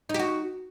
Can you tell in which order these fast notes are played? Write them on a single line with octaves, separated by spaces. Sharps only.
D#4 G4 F#4